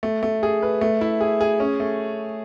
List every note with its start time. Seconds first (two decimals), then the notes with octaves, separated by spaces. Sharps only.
0.03 A3
0.23 A3
0.43 G#4
0.63 B4
0.81 A3
1.01 E4
1.21 G#4
1.41 G#4
1.60 C#4
1.80 A3